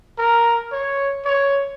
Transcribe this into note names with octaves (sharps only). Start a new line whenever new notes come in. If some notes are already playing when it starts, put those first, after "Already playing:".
A#4
C#5
C#5